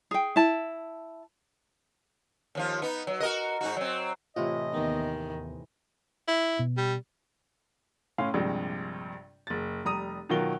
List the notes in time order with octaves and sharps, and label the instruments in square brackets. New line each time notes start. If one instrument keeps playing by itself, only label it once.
[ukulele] G#4 G5
E4 A5
[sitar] D#2 F3 F4
B3 D#4
F#3
F#4 A#4 D#5
G#2 D#4 F#4
F#3 C4
[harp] A2 C3 E3 [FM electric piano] F4 [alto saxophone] D#5
[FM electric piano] D#2 B3 [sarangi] D#3
[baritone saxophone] E4
[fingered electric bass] B2
[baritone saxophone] G3
[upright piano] A2 C#4 F5 C6
A#1 G2 C3 G#3
F#1 A6
F1 G3 A#5 D#6 D#7
B2 D#3 F#3 F4 A#4 G7